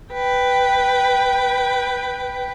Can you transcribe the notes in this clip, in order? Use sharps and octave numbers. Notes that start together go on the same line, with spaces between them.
B4 G5